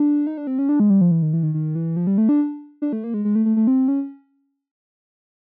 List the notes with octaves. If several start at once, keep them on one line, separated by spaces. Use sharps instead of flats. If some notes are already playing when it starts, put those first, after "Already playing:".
Already playing: D4
D#4
D4
C4
C#4
D4
G#3
G3
F3
E3
D#3
E3
D#3
D#3
E3
F3
G3
A3
D4
D4
A3
A#3
G#3
G#3
A3
A3
A3
C4
C#4